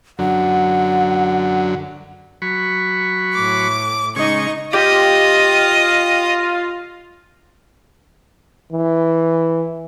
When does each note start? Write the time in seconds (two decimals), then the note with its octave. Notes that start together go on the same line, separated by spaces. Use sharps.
0.19 F#2 D3 F#3 F#5
2.42 F#3 B5 C#6
3.33 A2 D6
4.16 C#3 G#3 D#4 D#5 C#6
4.73 F4 G4 D#5
8.72 E3